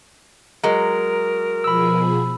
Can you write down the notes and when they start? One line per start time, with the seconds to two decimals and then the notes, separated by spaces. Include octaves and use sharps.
0.63 F#3 G#3 A#4
1.64 B2 F3 G#4 B5 E6